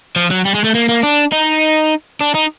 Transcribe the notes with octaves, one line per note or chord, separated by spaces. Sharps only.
F3
F#3
G3
G#3
A3
A#3
A#3
D4
D#4
D4
D#4